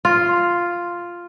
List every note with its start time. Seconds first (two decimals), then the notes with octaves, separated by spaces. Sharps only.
0.05 F4